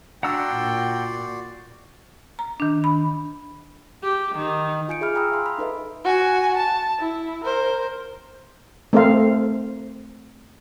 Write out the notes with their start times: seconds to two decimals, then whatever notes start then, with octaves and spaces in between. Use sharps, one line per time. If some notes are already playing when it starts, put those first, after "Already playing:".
0.23 D4 F#4 D5 F#5 G5 A#5 C6 E6
0.54 A#2
2.39 A#5
2.60 D#3 D4
2.84 B5
4.03 G4
4.36 D#3
4.88 F4 G#5 G6 C#7 D7
5.01 G#4 E5 B5 F6
5.15 G5 G#5 A#5 B5 D#6 E6
5.31 F5 A#5 C6
5.46 B5
5.58 D#4 A4 B4 D#5 E5
6.05 F#4 G#5
6.56 A5
7.00 E4
7.44 A#4 C5
8.93 A3 C4 A4 A#4 C5 F5